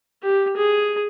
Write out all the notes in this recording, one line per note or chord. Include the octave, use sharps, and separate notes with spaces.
G4
G#4